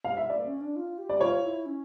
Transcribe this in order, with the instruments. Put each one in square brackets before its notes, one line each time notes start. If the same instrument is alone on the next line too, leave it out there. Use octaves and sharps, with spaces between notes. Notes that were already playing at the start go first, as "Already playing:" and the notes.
[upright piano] F5
E5
[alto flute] A#3 [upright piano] D5
[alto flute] C#4
D4
F4
G4
[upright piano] D5
[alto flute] F4 [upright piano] C#5
[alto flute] E4
C#4